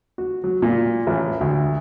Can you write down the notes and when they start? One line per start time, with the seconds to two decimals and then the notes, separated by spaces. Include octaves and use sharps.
0.18 F#4
0.44 F#3
0.62 A#2
1.07 A1
1.41 D2